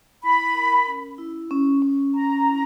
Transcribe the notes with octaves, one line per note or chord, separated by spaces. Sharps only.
E4 B5
A#4
C#4
E4
C#4
C#4
C#4 A#5
E4